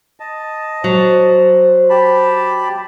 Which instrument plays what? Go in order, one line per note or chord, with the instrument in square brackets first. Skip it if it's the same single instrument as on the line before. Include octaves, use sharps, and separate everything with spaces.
[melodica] D#5 A5
[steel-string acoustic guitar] F#3 [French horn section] C5
[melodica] G4 A5 B5